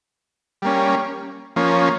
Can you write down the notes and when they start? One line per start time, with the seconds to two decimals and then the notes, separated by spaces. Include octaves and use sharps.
0.62 G3 A#3 C#4
1.56 F3 A#3 C#4